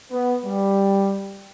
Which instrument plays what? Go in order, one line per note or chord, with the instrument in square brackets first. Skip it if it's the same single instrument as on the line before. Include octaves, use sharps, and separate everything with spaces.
[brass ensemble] B3
G3